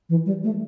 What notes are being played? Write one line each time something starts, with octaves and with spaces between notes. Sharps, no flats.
E3
G3
A3